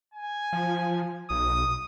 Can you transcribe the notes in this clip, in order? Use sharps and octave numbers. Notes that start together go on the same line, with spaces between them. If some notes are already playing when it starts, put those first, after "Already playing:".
G#5
F3
B1 D#6